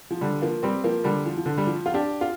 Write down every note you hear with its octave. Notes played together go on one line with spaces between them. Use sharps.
F3
D3 G3
F3 A#3
G3 C4
F3 A#3
D3 G3
F3
F3
D3
G3
F3
F4
D4 G4
F4